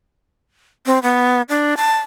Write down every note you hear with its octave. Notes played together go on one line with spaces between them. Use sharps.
C4
B3
D4
A5